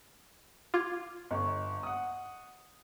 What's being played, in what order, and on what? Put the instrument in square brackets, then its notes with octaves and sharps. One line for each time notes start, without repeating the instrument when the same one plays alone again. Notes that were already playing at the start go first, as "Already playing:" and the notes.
[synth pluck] F4 [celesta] D6 G#6
[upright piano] G1 [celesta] D#5 C#6
[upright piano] F#5 D#6